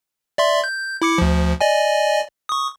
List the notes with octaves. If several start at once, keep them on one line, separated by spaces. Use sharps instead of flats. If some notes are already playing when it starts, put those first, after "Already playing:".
D5 E5 C6
G6
E4 D6 C#7
D2 F3
D5 D#5 G#5
C#6 D#6